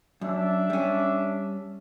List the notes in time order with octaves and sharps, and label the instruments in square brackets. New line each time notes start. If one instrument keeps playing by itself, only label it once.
[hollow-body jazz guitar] F#2 [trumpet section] D4 E5
[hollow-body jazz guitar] G3 C#4